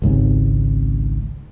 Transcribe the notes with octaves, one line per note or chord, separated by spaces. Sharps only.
G#1 C#2 G#2 C3